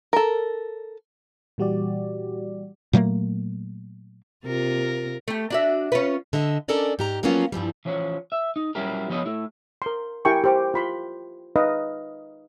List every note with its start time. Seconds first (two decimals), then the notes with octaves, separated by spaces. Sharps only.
0.13 A4 A#4
1.58 A#2 E3 G3 F#4 G4 D5
2.93 A#2 F#3 A3 A#3
4.45 C3 F4 A#4
5.28 A3 G4
5.50 D4 F#4 E5
5.92 C#4 F4 B4
6.33 D3 D#5 E5
6.68 C#4 D4 A4 A#4 D5 D#5
6.99 G#2 G4 A#5
7.23 F3 F#3 A#3 B3 C#4 F4
7.52 G2 E3 F3 G3
7.85 E3 F3 C#4 C#5
8.32 E5
8.56 D#4
8.75 F#3 G3 C#4 E4 G4 A#4
9.10 F3 B3 G4 C#5 D#5
9.26 A3 E4
9.82 A#4 C6
10.25 E4 G4 A#4 G5 G#5 C#6
10.44 G4 C5 D6
10.74 F4 B5 C6
11.56 D#4 B4 D#5 F5